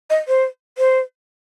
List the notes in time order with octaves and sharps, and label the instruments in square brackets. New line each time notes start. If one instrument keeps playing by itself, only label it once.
[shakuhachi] D#5
C5
C5